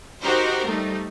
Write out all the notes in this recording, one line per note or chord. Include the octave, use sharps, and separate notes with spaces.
D#4 F#4 G4 A#4 C5
G3 A3 D#4